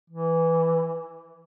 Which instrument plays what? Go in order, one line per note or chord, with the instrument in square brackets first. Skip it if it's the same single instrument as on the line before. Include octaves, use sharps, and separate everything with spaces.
[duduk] E3